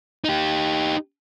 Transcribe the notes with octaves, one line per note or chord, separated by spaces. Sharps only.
D#4 G4